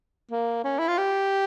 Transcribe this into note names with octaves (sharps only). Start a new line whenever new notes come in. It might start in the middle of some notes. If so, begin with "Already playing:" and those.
A#3
C#4
E4
F4
G4